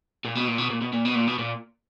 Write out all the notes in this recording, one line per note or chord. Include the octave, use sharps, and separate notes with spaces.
A#2
B2
A#2
B2
A#2
B2
A#2
B2
A#2
B2
A#2